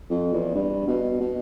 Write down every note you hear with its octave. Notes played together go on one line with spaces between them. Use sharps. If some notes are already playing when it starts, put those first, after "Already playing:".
F2
E2
G2
B2
B2